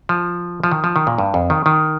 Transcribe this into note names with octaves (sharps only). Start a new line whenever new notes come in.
F3
F3
D#3
F3
D#3
A#2
G2
F2
D#3
D#3